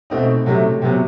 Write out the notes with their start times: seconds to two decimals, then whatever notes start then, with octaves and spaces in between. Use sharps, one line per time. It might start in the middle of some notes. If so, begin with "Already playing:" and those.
0.10 B2 A3 C4 D#4
0.46 C3 F#3 A3
0.82 C3 F#3 B3